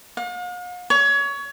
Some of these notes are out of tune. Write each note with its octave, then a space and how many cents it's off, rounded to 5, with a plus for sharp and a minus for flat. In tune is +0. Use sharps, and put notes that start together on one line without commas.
F5 +45
C#5 +25